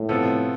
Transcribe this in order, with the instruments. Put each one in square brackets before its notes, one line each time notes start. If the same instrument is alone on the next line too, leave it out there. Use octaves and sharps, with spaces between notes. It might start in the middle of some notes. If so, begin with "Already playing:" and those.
Already playing: [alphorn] A2
[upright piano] C3 F3 B3 F4 A4